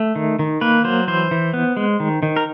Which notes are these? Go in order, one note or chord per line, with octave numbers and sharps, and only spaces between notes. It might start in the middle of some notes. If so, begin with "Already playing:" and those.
Already playing: A3
D#3
D#3
A#3 B4
F#3 C5
E3 C5
E3
B3
G#3
D#3
D#3
A#4